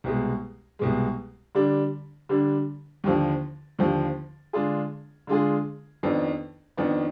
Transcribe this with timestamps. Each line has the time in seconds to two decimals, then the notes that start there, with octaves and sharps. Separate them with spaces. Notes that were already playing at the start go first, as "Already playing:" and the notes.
0.04 C2 B2 G#3
0.79 C2 B2 G#3
1.55 D3 G3 D4
2.29 D3 G3 D4
3.04 D#2 D3 F3
3.79 D#2 D3 F3
4.53 D3 G#3 D4 F4 G#4
5.27 D3 G#3 D4 F4 G#4
6.03 F2 D#3 B3 D4
6.77 F2 D#3 B3 D4